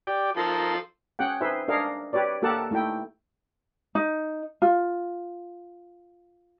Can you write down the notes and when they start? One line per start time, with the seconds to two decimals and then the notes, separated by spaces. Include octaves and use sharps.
0.07 G4 D5 G5
0.37 F3 D#4 A4 A#4 C6
1.19 C#4 G#4 F#5 G5
1.41 D#4 G#4 B4 C5 E5
1.68 D4 G#4 A#4 D#5 F5
2.13 G4 B4 C#5 D5
2.42 A#3 G4 A4 A#4 F#5 A5
2.71 A3 D#4 E4 G5
3.95 D#4
4.62 F4